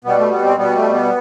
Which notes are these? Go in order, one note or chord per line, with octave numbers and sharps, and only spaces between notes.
B2 G3 B3
A3
B3
C4
B2 G3 B3
A3
B3